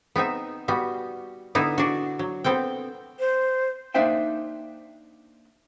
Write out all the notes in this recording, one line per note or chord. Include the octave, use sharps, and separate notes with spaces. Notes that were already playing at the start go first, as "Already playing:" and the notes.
B3 C4 D#4 E5
G3 B3 F#4
D3 B3 D#4 E4
D4 F#4
F#3
B3 C4 A4 G5
C5
A#3 D4 D#4 C5 E5 G5